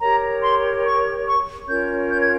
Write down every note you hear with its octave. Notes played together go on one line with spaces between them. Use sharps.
G4 A#4 C#5 A#5
C6
C#6
C#6
C#4 F4 A#4 C#5 G6
G6
G#6